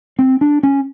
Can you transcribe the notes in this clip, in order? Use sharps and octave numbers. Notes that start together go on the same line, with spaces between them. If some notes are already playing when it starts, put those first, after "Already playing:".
C4
D4
C#4